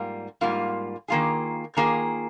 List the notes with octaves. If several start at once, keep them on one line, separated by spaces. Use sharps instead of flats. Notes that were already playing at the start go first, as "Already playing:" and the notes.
Already playing: G#2 G3 A#3 F4
G#2 G3 A#3 F4
D#3 A#3 F4 G#4
D#3 A#3 F4 G#4